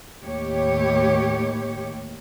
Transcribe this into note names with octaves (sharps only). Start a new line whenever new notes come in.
D#2 A2 G4 C#5